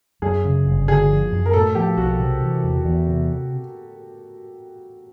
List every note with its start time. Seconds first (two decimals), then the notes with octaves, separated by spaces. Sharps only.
0.22 F#2 G#4
0.45 C#3
0.66 G1
0.88 D3 G#4
1.09 F3
1.32 F#2
1.46 A#4
1.53 A2 A4
1.75 F3 G4
1.97 B1 F#4
2.19 C3
2.42 E3
2.64 E2
2.85 E2
3.07 C3